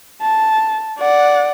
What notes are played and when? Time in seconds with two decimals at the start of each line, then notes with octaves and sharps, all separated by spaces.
0.22 A5
0.99 D5 F#5